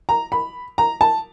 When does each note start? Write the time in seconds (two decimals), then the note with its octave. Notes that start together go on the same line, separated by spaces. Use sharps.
0.09 A#5
0.32 B5
0.78 A#5
1.01 A5